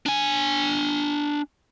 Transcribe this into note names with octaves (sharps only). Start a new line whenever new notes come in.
D4 G#5